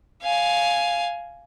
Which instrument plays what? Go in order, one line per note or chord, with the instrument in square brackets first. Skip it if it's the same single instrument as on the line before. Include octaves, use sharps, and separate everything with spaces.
[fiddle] F5 G#5